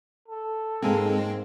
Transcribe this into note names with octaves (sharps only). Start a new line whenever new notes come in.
A4
G#2 G#3 A#3 C4 G#4